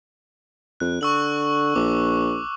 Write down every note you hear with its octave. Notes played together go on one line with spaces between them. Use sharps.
F2 F#6
D3 C#6 E6 F#7
A#1 D6